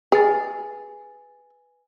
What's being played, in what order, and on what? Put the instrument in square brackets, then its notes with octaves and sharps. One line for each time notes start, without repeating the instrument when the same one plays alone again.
[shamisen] G#4 [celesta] B4 G#5 A6